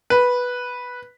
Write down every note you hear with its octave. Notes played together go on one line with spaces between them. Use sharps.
B4